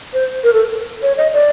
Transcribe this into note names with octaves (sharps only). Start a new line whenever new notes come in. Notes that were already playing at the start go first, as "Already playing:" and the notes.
C5
A#4
A4
C#5
D#5
D5